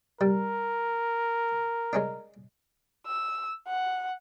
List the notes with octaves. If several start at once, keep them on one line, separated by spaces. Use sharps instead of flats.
G3 A#4
G#3 C#4 D4
E6
F#5